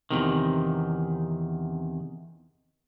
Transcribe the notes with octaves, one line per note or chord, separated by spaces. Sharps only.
E2 C3 D#3